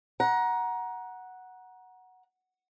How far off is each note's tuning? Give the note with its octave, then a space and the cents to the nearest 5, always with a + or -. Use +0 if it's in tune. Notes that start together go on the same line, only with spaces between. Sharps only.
F#5 +0 A#5 +25